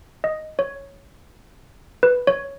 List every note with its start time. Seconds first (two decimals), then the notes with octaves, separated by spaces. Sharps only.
0.24 D#5
0.59 C#5
2.03 B4
2.27 C#5